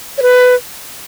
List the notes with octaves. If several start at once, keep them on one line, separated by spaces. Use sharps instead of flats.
C#5
B4